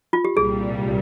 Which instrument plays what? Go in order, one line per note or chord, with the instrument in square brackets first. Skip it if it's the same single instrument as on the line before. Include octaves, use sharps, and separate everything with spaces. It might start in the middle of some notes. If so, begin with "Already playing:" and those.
[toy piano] F4
G4
[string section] C2 A#2 G3 [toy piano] G#4